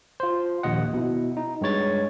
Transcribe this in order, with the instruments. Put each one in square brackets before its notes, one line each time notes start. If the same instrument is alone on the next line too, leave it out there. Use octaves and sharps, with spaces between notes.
[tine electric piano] F4 C5
A#1 D#2 D#5 F#5
B2 E4
D#4
G2 G#3 C#5 A6